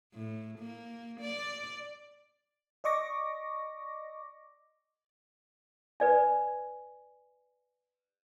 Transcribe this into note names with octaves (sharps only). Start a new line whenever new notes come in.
A2
A#3
D5
D5 D#5 C#6 D6 A#6
B4 D5 G#5